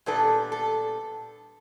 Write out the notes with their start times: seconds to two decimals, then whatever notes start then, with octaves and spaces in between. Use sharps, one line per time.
0.06 A#2 G3 B3 D4 A4
0.52 A4